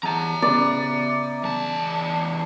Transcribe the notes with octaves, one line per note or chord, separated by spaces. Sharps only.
E2 E5 A5 A#5
C#3 B3 D5
E2 A5